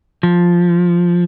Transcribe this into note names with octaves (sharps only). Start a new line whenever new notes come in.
F3